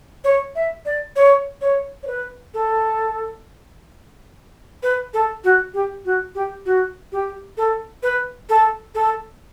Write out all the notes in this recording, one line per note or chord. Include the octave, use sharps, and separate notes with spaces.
C#5
E5
D5
C#5
C#5
C#5
B4
A4
B4
A4
F#4
G4
F#4
G4
F#4
G4
A4
B4
A4
A4